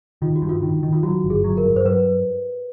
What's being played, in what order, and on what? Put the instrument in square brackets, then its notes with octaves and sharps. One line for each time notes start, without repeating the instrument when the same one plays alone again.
[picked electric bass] D#3 [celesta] F4
[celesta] F#4
[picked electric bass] G2
[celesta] F4
[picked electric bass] D#3
D#3
[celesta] F4
[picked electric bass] F#3 [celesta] F#4
[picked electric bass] G1
[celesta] G#4
[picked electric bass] F#3
[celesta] A#4
[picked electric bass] G2
[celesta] C5
[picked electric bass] F#3 [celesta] B4